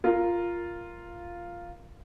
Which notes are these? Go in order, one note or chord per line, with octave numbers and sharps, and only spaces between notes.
F4 A#4